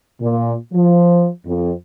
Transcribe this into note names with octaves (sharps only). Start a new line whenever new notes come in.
A#2
F3
F2